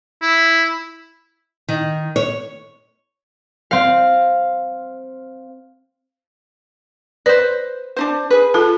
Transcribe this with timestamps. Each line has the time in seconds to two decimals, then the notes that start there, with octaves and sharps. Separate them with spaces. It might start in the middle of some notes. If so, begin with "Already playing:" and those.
0.22 E4
1.69 D#3
2.16 C#5
3.71 C4 F5
7.26 B4 C5 D5
7.97 D4 D#4 C5
8.30 G#4 B4
8.54 F4 A4 A5